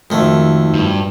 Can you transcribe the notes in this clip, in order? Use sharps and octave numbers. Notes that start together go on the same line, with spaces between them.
F2 D#3 G#3 A3 F#4
G2